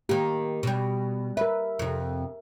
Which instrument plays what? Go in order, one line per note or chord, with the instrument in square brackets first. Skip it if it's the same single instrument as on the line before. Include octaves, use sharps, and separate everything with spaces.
[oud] D#3 A#3 [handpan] G4
[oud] B2 G3
[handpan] A#4 E5 [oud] B4
[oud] F2 C3